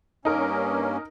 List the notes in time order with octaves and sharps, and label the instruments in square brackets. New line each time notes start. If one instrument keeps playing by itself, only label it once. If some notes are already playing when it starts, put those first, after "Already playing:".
[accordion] G2 A#3 C#4 [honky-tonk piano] D#4 A#4